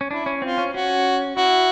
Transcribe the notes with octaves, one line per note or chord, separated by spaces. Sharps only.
C#4
D4 E4
C#4
C4 F4
C#4
C#4 F#4
E4 F#4